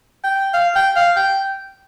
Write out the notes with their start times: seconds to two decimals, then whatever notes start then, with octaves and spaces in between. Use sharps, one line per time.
0.24 G5
0.54 F5
0.76 G5
0.96 F5
1.16 G5